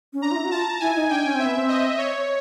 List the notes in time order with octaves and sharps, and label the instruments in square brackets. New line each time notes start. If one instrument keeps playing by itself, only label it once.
[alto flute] C#4
[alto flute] D4 [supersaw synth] A#5
[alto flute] F4
E4
F#4
[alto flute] F4 [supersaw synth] A5
[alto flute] E4 [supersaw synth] G#5
[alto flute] D#4
[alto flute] D4 [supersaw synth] G5
[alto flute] C#4
[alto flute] C4 [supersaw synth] E5
[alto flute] B3
C4
[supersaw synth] D#5
C#5